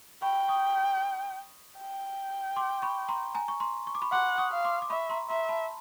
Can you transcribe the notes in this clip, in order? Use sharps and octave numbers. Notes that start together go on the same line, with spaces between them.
G5 B5 C#6
C#6 D#6
G5
C6 D6
B5 C#6
A#5 C6
G#5 A#5
C#6
A#5 C6
C#6
D6
B5 C#6
F#5 C6 D6
C#6 D#6
F5
C6 D6
D6
E5 B5 C#6
A#5 C6
E5 A#5 C6
A5 B5